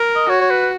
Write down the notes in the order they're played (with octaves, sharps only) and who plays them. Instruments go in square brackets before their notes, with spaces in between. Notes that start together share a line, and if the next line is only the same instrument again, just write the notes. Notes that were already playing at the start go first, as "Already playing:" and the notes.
Already playing: [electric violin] A#4
[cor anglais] D#5
[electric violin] F#4 [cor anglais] C#5
[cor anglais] C#5
B4